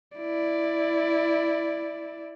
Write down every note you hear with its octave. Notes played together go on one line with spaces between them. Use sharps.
E4 D5